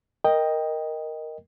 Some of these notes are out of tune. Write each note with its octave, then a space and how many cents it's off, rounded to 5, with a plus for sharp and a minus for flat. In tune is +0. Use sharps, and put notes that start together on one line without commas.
A#4 +0 D#5 +0 G5 +10